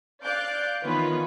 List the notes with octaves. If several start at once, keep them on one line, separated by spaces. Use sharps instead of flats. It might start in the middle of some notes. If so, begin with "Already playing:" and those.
D5 F5 D6 F#6 G6
D#3 E3 B3 C#4 F4 B4